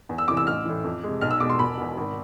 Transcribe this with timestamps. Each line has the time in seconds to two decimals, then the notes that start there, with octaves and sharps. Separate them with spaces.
0.09 E2
0.18 E6
0.28 C3 E3 D6
0.37 E6
0.47 A1 F6
0.65 A2 E3
0.84 F2
1.03 C3 G#3
1.21 B1 F6
1.31 E6
1.40 B2 G#3 D6
1.49 C6
1.59 E1 B5
1.77 E2 B2
1.97 G#1